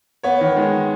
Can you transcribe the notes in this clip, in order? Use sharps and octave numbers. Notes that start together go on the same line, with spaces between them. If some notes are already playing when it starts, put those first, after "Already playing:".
B3 C#5
D#3
G#3